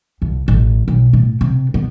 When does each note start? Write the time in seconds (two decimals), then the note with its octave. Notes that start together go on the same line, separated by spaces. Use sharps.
0.22 C2
0.48 A1
0.88 B1
1.13 A2
1.41 C3
1.74 B3